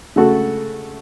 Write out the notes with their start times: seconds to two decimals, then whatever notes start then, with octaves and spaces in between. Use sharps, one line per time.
0.16 C#3 A3 F#4 A4